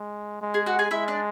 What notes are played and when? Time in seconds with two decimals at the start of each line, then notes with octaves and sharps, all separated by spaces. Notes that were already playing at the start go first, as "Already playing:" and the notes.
Already playing: G#3
0.41 G#3
0.54 G#4
0.66 F#4 F#5
0.79 G#4 G#5
0.91 G#3 E4 E5
1.08 D4 D5